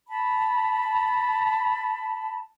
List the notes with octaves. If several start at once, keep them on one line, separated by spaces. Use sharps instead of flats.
A5 B5